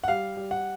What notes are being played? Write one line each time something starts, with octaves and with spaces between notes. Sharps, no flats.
F#5
G3 F5
G3
F#5